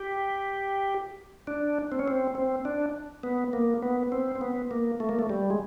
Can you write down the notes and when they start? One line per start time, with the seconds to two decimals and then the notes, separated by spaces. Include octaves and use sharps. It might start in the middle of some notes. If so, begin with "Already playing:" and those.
Already playing: G4
1.47 D4
1.92 C4
1.99 C#4
2.08 C4
2.35 C4
2.65 D4
3.23 B3
3.53 A#3
3.82 B3
4.12 C4
4.35 C4
4.41 B3
4.71 A#3
5.00 A3
5.09 A#3
5.19 A3
5.30 G3
5.50 G#3